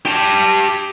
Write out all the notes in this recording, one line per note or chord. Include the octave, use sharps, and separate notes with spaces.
G4 A5